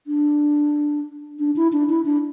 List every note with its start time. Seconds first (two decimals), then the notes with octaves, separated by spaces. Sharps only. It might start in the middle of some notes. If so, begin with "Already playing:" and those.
0.07 D4
1.39 D4
1.56 E4
1.73 D4
1.89 E4
2.05 D4